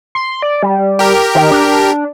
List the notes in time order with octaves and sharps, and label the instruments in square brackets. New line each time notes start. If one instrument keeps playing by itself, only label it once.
[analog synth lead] C6
D5
G3
[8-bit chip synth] G4 A#4
[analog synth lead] D#3
D4